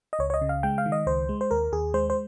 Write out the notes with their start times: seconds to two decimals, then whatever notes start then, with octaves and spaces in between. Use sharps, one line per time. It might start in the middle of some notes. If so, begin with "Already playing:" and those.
0.13 D#5
0.19 C#2 C#5
0.30 C#5
0.34 D#5
0.41 C#3
0.49 F5
0.63 G#3 G5
0.78 F5
0.86 D#3
0.92 D#5
1.07 C#2 C5
1.29 G#3
1.41 C5
1.51 D#2 A#4
1.72 D#2 G#4
1.94 G#3 C5
2.10 C5